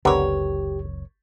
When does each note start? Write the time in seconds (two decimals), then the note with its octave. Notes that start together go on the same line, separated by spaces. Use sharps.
0.05 F#1 C#2 D3 B3 G4 A#4 C#5